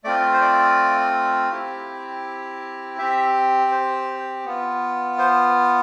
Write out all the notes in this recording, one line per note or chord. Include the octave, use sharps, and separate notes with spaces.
A3 C4 F4 D5
C5
D5
C4 E4 G4
C4 G4 E5
C5
B3 F4
C5